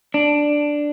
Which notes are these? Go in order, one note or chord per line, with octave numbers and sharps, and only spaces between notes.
D4